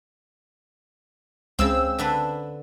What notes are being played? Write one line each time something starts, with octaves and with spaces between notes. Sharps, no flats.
C#2 C#3 C4 E6
D3 D4 B4